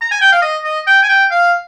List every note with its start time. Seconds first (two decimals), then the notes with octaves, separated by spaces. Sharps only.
0.01 A#5
0.11 G#5
0.21 G5
0.32 F5
0.42 D#5
0.64 D#5
0.87 G5
1.03 G#5
1.09 G5
1.31 F5